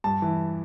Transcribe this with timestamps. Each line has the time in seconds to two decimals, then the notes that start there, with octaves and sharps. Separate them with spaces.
0.04 G2 A5
0.22 E3